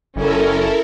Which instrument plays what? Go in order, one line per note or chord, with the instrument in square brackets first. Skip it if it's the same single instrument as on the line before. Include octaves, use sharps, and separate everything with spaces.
[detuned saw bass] F#1 [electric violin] C#4 [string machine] E4 A4 A#4